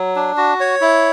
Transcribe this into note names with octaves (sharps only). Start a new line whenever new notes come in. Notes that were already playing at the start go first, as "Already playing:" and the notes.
Already playing: F#3
D4
F#4
C#5
E4